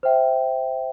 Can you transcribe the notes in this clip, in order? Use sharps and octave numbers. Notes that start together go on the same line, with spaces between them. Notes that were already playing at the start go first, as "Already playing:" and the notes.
C5 E5 G5